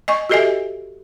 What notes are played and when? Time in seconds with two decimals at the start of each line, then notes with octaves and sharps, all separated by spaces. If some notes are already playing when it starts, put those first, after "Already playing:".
0.08 D#5 G#5 C#6
0.29 F#4 G4 A4 D#5 E5 G#5